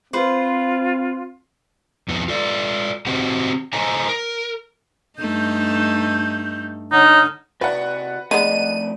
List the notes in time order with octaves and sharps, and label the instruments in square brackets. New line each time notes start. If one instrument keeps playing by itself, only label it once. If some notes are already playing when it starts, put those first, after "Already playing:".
[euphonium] C4 [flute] F4 [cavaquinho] B4 C5
[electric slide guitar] F2 B3
F4 A4 D5
C4 F#4 G4 C5 D#5 F#5
A4 C5 D#5 G#5 A#5
A#4
[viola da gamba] G2 A3 D#4 [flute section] G6
[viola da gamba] D3 [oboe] D#4 [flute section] C#5 F#5 F6
[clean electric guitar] C3 F#4 D5 [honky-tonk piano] B4 F#5
[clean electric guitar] F2 A3 D5 [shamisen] D#3 G#3 B3 [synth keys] D#7